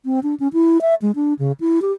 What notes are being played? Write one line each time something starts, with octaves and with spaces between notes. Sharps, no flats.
C4
D4
C#4
E4
E5
G#3
D4
C#3
E4
G4